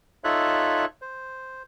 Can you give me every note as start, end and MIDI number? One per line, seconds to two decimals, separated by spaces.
0.24 0.85 63
0.24 0.85 65
0.24 0.85 69
0.24 0.85 73
0.24 0.85 76
0.24 0.85 90
1.02 1.63 72